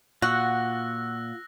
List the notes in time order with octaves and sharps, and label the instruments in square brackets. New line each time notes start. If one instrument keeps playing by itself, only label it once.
[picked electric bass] A#2 [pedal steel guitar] F4 F#5 [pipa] F#4 [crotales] E6 F#6 A#6